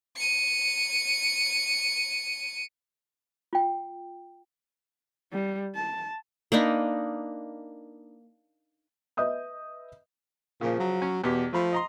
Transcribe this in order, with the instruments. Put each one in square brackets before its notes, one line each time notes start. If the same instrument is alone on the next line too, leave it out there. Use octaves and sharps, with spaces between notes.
[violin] C#7 D#7
[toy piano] F4 G5
[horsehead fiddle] G3
A5
[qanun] A#3 D4 D#4 B4
[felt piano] B4 D#5 E5 D#6 G6
[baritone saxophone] A#2 [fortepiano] C#3 F3
[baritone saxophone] F#3
[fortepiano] C#4
[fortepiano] E2 G4 [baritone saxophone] B2
[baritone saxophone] F3 [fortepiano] A3 B5
[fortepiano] D#5 A#5 C6